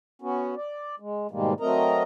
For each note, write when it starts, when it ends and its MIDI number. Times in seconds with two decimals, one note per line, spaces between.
0.22 0.55 59
0.22 0.55 61
0.22 0.55 66
0.56 0.95 74
1.00 1.27 56
1.31 1.53 44
1.31 1.53 47
1.31 1.53 51
1.31 1.53 55
1.31 1.53 56
1.31 1.53 58
1.60 2.03 54
1.60 2.03 57
1.60 2.03 60
1.60 2.03 70
1.60 2.03 75
1.60 2.03 82